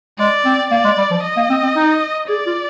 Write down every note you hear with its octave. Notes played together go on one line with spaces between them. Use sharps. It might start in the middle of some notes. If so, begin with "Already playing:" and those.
G#3 D5
C4
A#3 D5
G#3
G3
F3
D#5
A#3
C4
C4
D#4
G#4 D5
F4